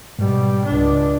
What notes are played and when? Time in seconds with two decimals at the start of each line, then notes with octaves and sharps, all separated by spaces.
0.19 G#2 B2 G3
0.65 C#2 D4